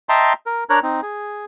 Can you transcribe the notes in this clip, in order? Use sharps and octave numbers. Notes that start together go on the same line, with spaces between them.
D#5 E5 G5 A5 A#5 C6
A#4
D4 A#4 C#5 A#5 F6 F#6
C4 D#4
G#4